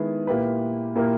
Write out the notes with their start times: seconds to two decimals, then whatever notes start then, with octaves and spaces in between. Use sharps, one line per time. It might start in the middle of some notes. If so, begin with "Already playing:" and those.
Already playing: D#3 G#3 B3 E4 G#4
0.27 A#2 A#3 E4 G4 B4
0.95 A#2 A#3 E4 G4 A#4